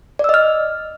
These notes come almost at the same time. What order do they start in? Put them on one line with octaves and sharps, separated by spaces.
D5 E6 D#5 F6